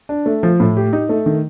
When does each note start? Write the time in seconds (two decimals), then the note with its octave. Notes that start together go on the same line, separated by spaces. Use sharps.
0.09 D4
0.26 A3
0.43 F3
0.60 A2
0.77 G4
0.93 D#4
1.09 A3
1.26 D#3